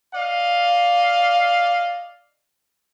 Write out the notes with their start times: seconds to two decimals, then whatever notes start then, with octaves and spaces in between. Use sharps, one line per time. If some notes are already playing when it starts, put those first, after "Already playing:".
0.15 D5 D#5 F5